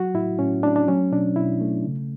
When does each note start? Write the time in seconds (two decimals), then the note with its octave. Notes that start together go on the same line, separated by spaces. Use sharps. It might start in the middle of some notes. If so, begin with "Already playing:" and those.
Already playing: F#3 F#4
0.14 A2 E4
0.39 A2 C#4
0.63 A3 D4
0.76 D4
0.88 F#3 C#4
1.12 B2 D4
1.36 B2 E4
1.61 A3
1.85 C#3